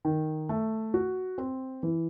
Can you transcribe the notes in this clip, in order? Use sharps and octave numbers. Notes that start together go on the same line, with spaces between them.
D#3
A3
F#4
C4
E3